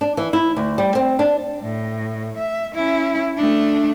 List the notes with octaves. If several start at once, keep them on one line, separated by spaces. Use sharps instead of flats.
D4
E3
E4
D2
G3
C4
D4
A2
E5
C#4 E4
A3 D4